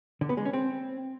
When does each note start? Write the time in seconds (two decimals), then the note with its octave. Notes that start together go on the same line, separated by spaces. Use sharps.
0.21 D3
0.29 B3
0.37 G#3
0.45 C#4
0.53 C4